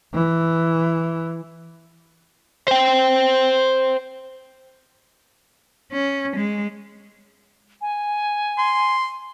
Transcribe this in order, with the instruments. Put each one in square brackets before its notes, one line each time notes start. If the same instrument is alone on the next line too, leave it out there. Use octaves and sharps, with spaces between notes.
[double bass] E3
[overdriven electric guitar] C5 G5
[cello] C#4
G#3
[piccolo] G#5
[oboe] C6